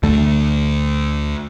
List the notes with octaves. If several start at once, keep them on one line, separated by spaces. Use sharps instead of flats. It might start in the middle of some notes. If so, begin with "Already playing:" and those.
D2 D3 A3